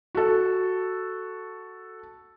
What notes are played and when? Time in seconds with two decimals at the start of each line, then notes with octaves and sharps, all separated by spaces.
0.15 F#4 A4